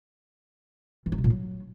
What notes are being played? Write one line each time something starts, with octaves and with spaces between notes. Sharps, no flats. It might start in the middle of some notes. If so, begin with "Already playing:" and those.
E3
D#4
C3
A#2
F#3